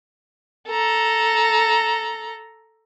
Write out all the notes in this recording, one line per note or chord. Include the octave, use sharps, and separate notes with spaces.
A4 A#5